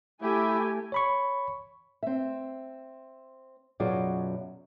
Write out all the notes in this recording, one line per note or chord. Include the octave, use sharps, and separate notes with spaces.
A3 E4 G4 G#5
C#5 B5 C#6
C4 E5
F#2 B2 F#3 F4 G#4 D5